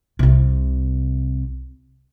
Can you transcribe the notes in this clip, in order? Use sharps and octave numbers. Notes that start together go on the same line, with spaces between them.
C2 C3